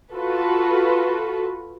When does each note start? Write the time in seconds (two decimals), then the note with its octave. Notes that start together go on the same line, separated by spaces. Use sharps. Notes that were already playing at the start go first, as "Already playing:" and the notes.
0.15 F4 F#4 A4 B4